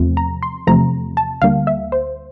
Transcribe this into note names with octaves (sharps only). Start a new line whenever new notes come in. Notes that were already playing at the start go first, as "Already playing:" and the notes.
Already playing: E2 C3 F3 A3 C4
A#5
C6
E2 C3 F3 A3 C4 A#5
A5
D2 D3 G3 A#3 F5
E5
C5